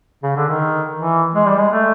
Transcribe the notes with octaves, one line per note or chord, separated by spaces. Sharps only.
C#3
D3
D#3
E3
G#3
G3
G#3
A3